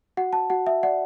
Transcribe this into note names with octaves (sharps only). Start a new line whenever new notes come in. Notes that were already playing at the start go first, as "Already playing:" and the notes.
F#4 F#5
A5
F#4 F#5
E5
D5 F#5